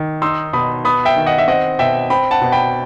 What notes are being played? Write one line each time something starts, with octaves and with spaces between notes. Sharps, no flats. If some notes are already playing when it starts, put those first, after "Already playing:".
Already playing: D#3
D#4 C6 E6
B2 B5 D#6
B3 B5 D#6
E5 G5
D#3
D#5 F#5
E5
C4 D#5 F#5
B2 E5 G5
C4 G5 B5
F#5 A5
B2
G5 B5